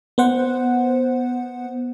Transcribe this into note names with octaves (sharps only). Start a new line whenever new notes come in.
B3 C5 F#5